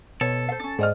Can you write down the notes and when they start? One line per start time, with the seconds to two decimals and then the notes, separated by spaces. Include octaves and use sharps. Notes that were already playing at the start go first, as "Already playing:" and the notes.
0.21 B2 A4 C#5
0.49 C5 F5
0.60 C#4 D4 A6
0.79 G#2 C5 D5 D#5 F6